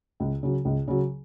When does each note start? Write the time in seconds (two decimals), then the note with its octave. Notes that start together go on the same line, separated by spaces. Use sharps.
0.20 C#2
0.43 C#3 F#3
0.65 C#2
0.88 C#3 F#3